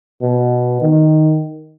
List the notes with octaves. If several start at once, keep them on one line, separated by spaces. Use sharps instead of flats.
B2
D#3